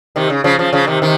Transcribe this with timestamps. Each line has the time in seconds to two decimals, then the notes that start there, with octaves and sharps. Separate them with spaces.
0.16 C3 D#3
0.30 C#3
0.44 C#3 F3
0.59 C#3 F3
0.73 C#3 F3
0.87 C3 D#3
1.02 C3 D#3